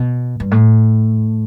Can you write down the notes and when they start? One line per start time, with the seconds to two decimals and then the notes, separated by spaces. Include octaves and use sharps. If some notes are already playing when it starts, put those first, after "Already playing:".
Already playing: B2
0.40 G2
0.51 A2